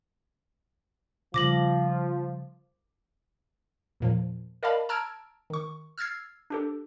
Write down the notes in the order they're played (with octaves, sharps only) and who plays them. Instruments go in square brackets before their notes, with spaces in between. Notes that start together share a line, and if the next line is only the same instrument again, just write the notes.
[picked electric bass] C#3 G3 [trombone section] F3 [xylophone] D6 A#6 F#7
[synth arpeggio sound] E2 A#2 F3
A#4 D5 D#5 F5 A5 B5
A5 A#5 E6 F6 G#6 D7
D#3 C#6
E6 F6 G#6 A6 C7
D4 G4 A4